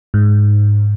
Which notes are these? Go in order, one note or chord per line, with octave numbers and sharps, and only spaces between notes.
G#2